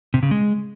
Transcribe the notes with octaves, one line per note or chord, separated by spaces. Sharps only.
C3
C#3
G#3